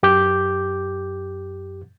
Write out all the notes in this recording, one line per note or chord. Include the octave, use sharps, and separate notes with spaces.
F#2 G4 D6 G6